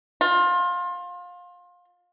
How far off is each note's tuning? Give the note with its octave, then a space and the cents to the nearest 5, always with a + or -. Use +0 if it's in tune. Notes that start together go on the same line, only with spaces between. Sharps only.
F4 +25